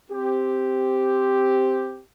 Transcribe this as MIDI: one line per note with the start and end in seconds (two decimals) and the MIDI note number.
0.10 2.00 60
0.10 2.00 67